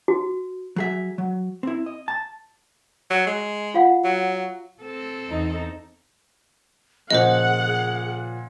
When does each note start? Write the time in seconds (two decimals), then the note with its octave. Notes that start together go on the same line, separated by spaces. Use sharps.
0.08 F#4
0.76 F#3 G#4 E5
1.18 F#3
1.63 C4 E4
1.86 D#5
2.08 A5
3.11 F#3
3.27 G#3
3.74 F4 F5 F#5
4.04 F#3
4.83 C4 A4
5.26 E2 D#4
7.11 A#2 C#3 F3 G#4 C5 D#5 F#5